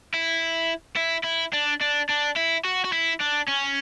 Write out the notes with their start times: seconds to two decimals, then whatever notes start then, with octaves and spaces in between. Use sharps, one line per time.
0.14 E4
0.97 E4
1.24 E4
1.53 D4
1.81 D4
2.09 D4
2.36 E4
2.65 F#4
2.85 F#4
2.92 E4
3.20 D4
3.48 C#4